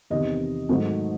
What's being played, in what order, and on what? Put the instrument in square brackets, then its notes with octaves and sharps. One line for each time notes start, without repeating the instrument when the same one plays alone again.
[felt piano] E2 C3 D#3 D#5
G#2 D#3 F#3 A3